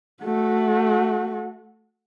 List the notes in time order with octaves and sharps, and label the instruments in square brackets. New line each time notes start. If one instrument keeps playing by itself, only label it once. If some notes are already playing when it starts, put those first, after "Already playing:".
[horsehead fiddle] A3 F#4